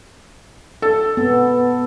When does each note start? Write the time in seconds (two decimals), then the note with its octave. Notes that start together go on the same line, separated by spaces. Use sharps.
0.82 A4
1.17 B3